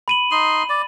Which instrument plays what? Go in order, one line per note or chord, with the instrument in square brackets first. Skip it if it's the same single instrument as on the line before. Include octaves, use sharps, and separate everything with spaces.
[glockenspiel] B5 D#7 F#7
[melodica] D#4 C6
D5